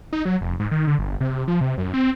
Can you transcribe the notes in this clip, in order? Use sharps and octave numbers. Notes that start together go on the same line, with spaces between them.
D#4
F#3
F1
G#2
D#3
D3
G1
C3
F3
C3
F#2
C4